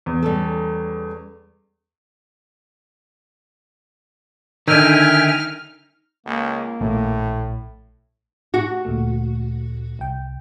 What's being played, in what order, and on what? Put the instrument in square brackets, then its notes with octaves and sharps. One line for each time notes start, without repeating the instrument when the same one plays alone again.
[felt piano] E2
[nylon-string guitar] G3 C#4 A4
[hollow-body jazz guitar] D3 D#3 [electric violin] D#4 F6 [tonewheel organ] E5 G5 G#5
[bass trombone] C#2 [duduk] A#3
[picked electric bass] A#1 A3 [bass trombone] A2
[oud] F#4
[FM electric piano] D2 A#2 A3
C2 G5